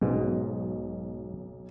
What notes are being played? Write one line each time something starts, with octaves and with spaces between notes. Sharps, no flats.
B1 G#2 B2 G#3